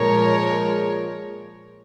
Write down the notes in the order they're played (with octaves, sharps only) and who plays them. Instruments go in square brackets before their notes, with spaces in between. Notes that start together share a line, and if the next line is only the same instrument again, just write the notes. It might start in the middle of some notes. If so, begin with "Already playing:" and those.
Already playing: [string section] A#2 F3 G#3 A#4 C#5